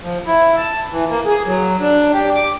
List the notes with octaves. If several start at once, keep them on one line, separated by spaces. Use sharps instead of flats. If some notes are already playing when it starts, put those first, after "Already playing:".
F3
E4
A5
E3
A#3
G#4
F#3
D4
G4
D6